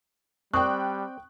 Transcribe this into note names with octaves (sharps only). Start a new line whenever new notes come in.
G3 C4 D5 G5 C#6 D#6 F#6